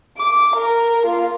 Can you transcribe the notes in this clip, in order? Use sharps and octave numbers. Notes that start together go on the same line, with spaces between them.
D6
A#4
A#3 F4